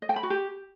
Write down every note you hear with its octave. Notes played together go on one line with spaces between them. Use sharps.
D#5
G5
B5
F#4
G4